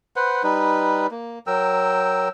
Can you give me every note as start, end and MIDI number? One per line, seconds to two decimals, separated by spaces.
0.16 0.43 71
0.16 0.43 72
0.16 0.43 78
0.44 1.07 55
0.44 1.07 63
0.44 1.07 71
1.11 1.39 58
1.47 2.28 54
1.47 2.28 70
1.47 2.28 79
1.47 2.28 88